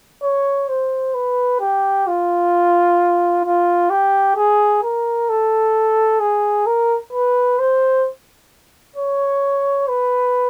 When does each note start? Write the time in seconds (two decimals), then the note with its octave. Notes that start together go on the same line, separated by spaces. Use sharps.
0.22 C#5
0.68 C5
1.14 B4
1.60 G4
2.07 F4
3.45 F4
3.90 G4
4.37 G#4
4.83 A#4
5.29 A4
6.20 G#4
6.66 A#4
7.13 B4
7.59 C5
8.96 C#5
9.88 B4